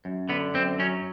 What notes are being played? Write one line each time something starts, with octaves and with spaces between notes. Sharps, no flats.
F#2
D3 B3
F#2 C4
F#3 C#4